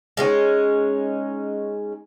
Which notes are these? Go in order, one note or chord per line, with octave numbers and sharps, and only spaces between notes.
G#3 C#4 D#4